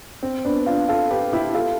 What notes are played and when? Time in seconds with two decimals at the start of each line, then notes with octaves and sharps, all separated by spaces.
0.23 C4
0.45 B3 D4
0.67 D4 F4
0.89 F4 A4
1.11 G4 B4
1.32 E4 G4
1.54 F4 A4